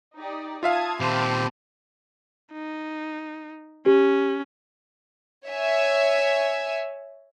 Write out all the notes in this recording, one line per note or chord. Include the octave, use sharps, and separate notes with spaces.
D#4 G4 D5
F4 E5 F5 A5 D#6 G#6
A#2 D#3 C4 G4 A5 B5 C6
D#4
C#4 G4
C#5 E5 G#5